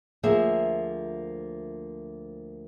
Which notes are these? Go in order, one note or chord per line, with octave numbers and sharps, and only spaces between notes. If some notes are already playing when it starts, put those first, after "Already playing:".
D2 F3 A#3 G#4 E5